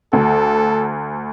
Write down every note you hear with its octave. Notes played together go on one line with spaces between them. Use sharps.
D2 A4